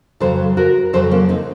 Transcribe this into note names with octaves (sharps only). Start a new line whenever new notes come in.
F2 C#3 F#3 A4 C5
F#4 A#4
F2 C#3 F#3 A4 C5
A#3 C#4
C4 D#4